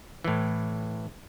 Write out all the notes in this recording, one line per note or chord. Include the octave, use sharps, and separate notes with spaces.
A2 E3